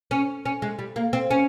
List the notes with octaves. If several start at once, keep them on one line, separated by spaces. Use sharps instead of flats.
C#4
C#4
G#3
G3
A#3
C4
C#4